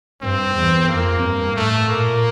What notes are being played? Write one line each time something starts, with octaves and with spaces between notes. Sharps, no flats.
G2 C4
E2
F2 A#3
G2
A2 A3
A#2 A#3